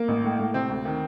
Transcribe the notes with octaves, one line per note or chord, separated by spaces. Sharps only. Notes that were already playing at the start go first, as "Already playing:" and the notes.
Already playing: A#3
A1
A2
A2
C3 C4
D2
D#3